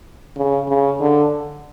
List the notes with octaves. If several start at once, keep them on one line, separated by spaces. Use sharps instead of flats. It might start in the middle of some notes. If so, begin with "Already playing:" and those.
C#3
C#3
D3